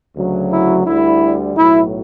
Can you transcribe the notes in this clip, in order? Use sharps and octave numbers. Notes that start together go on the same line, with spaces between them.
D2 C#3 F#3
E4
D2 D3 G3 E4
B1 A2 F#3 E4